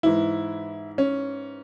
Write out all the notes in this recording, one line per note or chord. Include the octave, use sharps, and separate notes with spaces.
G#2 E3 E4
C#4